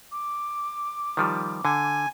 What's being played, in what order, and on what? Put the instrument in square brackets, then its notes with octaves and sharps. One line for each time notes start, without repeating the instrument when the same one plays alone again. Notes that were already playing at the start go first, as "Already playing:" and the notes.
[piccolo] D6
[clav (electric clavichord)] D#3 F3 G3
[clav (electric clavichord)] D3 [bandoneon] G#5